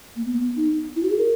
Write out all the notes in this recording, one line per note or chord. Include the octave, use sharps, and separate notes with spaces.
A#3
B3
B3
D#4
E4
F#4
G#4
A#4